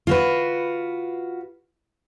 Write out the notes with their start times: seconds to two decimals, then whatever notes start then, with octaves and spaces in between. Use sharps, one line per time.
0.07 F4 F#4 B4